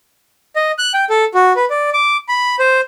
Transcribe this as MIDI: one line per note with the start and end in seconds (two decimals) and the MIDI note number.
0.56 0.71 75
0.78 0.92 90
0.94 1.05 79
1.10 1.25 69
1.34 1.53 66
1.56 1.65 71
1.70 1.90 74
1.94 2.17 86
2.28 2.56 83
2.59 2.81 72